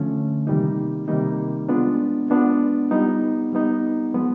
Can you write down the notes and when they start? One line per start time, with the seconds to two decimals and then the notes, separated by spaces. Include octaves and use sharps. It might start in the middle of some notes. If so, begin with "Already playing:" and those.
Already playing: D3 F3 A3 C#4
0.47 C3 D#3 G3 A#3 D#4
1.08 C3 D#3 G3 A#3 D#4
1.69 G#3 B3 D4 F4
2.30 G#3 B3 D4 F4
2.91 G3 B3 D#4
3.53 G3 B3 D#4
4.14 F3 G#3 B3